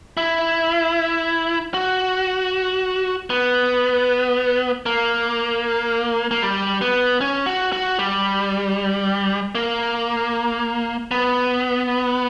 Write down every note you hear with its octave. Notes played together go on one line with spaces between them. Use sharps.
E4
F#4
B3
A#3
A#3
G3
B3
C#4
F#4
F#4
G3
A#3
B3